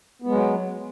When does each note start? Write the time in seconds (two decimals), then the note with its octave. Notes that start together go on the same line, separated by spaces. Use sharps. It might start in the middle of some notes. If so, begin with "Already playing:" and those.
0.22 B3
0.27 G#3
0.31 F#3